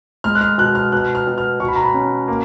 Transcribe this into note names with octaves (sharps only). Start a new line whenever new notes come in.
G#3 F6
F#6
F6
B2 F#6
F6
B2 F#6
F6
B2
F6
B2 C#6
B5
A#5
B5
C#4
A#3